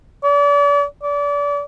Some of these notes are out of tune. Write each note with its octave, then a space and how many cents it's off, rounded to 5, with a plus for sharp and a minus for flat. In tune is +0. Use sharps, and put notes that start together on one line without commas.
D5 -40
D5 -30